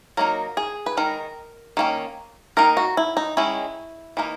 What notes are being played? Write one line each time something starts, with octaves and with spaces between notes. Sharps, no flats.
F#3 A#3 D#4 A#4
G#4
B4
D#3 G#3 D#4 A#4
D#3 A#3 C#4
D#3 A#3 D#4 A#4
F#4
E4
D#4
D#3 G#3 C#4 E4
E3 A#3 D#4